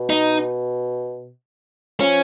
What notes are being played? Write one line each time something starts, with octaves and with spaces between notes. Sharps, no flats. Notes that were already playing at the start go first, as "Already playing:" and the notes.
Already playing: B2
D#4
F3 C#4